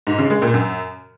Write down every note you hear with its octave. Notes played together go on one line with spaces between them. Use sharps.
G#2
C#3
G#3
A#2
F#2